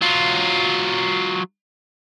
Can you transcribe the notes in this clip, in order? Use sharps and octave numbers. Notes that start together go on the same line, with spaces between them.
F#3 F4